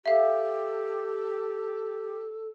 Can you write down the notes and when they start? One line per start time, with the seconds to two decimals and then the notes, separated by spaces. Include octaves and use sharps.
0.06 G4 A4 E5 F5